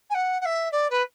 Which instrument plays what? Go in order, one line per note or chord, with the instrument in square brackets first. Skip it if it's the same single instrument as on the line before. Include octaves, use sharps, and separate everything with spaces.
[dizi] G#5
F#5
F#5
E5
D5
B4